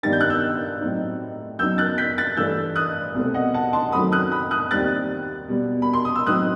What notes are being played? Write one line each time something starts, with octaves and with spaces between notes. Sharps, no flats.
G2 D#3 G3 B3 D#4 A6
G6
F#6
E6 G6
A2 F#3 C4 D#4
F#2 F#3 B3 D#4 E6 G6
F#6 A6
G6 B6
F#6 A6
G2 E3 A3 E6 G6
D#6 F#6
C2 B2 A3 C4
D#5 F#5
F#5 A5
A5 C6
F#2 D#3 F#3 A3 C4 B5 D#6
D#6 F#6
B5 D#6
D#6 F#6
D#2 D#3 G3 C4 F#6 A6
B2 G3 B3
B5
C6
D#6
E6
A2 F#3 C4 D#4 D#6 F#6